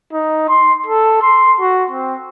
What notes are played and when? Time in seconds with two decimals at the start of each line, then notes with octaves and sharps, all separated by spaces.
0.13 D#4
0.49 C6
0.86 A4
1.22 C6
1.60 F#4
1.91 C4